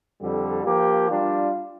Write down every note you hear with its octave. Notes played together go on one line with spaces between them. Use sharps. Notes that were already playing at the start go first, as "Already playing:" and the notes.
F2 D3 G3
F3 A#3 G4
G3 D4 F4